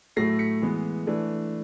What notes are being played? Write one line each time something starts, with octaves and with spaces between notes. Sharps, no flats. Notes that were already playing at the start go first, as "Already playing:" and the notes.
A2 F#3 A3 A#6 C7
B6 C#7
E3 G#3 B3
E3 A3 D4